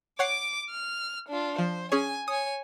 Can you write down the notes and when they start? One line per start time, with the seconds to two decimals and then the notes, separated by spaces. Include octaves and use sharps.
0.19 C#5 F#5 D6 C7 D7
0.70 F6
1.29 D4 F4
1.58 F3 C5
1.92 C#4 G#4 C#5 G#5
2.28 C#5 G#5 D#6